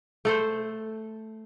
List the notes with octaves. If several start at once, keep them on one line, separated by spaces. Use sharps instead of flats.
A3 A4 C5